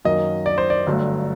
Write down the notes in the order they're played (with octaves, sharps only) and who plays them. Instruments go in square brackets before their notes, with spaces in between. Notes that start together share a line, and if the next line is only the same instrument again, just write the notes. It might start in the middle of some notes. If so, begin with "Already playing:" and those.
[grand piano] F#2 D#3 F#3 A#3 D#5
D5
C5
D5
G1 G2 F#3 A3